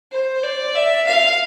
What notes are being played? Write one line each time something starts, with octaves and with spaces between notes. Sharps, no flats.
C5
D5
E5
F5